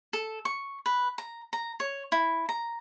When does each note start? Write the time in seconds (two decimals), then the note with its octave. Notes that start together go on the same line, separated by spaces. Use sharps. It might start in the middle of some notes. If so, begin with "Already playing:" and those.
0.13 A4
0.45 C#6
0.86 B4
1.18 A#5
1.53 A#5
1.80 C#5
2.12 E4
2.49 A#5